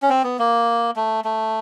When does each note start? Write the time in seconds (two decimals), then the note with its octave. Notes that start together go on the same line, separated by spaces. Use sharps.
0.02 C#4
0.10 C4
0.24 B3
0.39 A#3
0.96 A3
1.24 A3